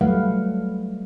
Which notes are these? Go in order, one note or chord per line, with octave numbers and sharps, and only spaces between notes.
F#3 G3 A3 B4 F5 F#5